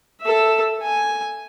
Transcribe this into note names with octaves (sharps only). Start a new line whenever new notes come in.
A4 E5
G#5